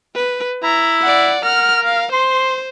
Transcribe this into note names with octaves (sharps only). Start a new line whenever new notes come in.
B4
E4 A#5
D5 F#5
A#4 F#5 F6
F5
C5 C6